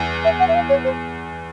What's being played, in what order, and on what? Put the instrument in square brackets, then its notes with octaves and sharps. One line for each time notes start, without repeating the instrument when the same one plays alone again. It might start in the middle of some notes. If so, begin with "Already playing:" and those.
Already playing: [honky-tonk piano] E2 E3
[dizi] E5
F#5
E5
F5
C#5
C5